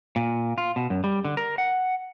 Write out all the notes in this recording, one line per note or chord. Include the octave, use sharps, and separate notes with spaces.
A#2
F4
B2
F#2
G3
D3
A#4
F#5